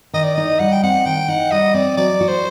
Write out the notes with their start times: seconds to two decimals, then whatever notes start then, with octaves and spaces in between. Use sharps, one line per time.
0.13 D#3 D#5
0.24 D5
0.35 D#4 D#5
0.59 G3 F#5
0.72 G5
0.83 C4 F#5
1.06 D#3 G5
1.28 D#4 F#5
1.51 G3 D#5
1.74 C4 D5
1.97 F#3 D5
2.21 F#4
2.28 C5